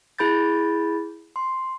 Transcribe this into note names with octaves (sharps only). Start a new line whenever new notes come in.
E4 G#4 B5 G6 A6
C6